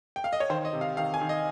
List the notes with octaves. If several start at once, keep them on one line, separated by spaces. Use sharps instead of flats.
G5
F5
D#5
C#5
D#3 C5
D#5
C3
F5
D#3 F5
G#5
D#3
D#5